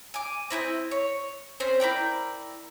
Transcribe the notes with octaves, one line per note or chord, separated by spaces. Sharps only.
G#5 D6
C4 E4 B4 D#5
C#5
C4 C#4 C5
E4 A#4 D5 G5